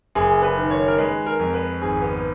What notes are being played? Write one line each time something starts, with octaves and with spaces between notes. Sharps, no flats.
F#1 G#4
B4
D#3
C#5
A#4
G#3 B4
A#4
F2
B4
G#1 G#4
B3